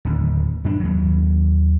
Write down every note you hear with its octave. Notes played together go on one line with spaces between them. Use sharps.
D1 D#2
F#2 D4
D#2 F#3